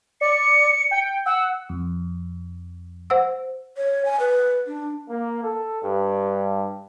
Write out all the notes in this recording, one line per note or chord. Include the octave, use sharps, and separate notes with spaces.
D5 C#7
G5
F#5 E6
F2
C5 F#5 E6
C#5
G#5
B4
D4
A#3
A4
G2